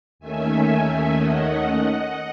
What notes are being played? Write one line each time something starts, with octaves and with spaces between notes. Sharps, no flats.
D#2 D#3 A3 C#4 E5 G#5
D#5 F#5